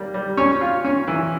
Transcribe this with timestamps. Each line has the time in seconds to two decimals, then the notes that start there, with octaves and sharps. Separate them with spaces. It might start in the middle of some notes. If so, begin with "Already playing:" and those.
Already playing: G3 A#3
0.14 G3
0.37 C#4 C#5
0.61 F4
0.85 C#4
1.07 E3